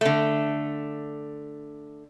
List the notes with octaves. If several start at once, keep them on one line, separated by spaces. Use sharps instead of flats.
D3 A3